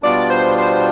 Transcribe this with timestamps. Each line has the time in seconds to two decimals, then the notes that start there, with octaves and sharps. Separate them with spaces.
0.03 B2 G3 B3 D4 F4 D5
0.30 C5
0.58 C5